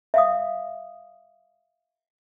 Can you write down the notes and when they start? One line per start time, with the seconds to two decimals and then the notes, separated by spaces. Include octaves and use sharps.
0.14 E5 F5 D#6